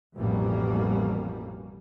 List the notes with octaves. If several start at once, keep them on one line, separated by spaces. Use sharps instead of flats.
A1 F2 B2 E3 G3 A#3